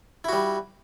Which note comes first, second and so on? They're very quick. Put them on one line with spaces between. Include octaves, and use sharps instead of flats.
E4 F#4 G3